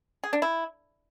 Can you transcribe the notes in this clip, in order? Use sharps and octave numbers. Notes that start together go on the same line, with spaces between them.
G#4
D4
E4